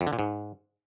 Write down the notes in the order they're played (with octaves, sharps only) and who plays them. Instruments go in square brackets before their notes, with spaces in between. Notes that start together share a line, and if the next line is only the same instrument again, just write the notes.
[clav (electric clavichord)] F2
D3
A#2
G#2